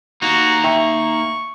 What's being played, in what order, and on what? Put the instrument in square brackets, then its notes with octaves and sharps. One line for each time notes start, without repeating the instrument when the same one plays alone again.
[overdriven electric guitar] A#3 D#4 [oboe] F#4
[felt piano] E5 G5 [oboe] C#6